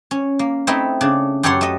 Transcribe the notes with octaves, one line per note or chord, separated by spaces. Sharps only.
C#4
A#3
A3 C4 D#4 E4
C#3 D4
F#2 G4 A4 C#5 F#5 C6
A3 D#5